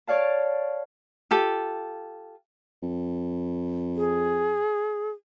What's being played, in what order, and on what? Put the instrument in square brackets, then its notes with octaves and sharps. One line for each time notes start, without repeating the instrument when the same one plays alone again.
[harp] C#5 D5 F5 A5
[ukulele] F4 G4 A4
[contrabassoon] F2
[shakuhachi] G#4